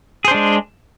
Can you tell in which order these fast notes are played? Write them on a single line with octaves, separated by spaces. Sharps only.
G#4 C5 D4 G#3